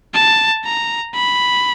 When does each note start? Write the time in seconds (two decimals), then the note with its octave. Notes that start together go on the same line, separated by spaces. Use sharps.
0.14 A5
0.65 A#5
1.14 B5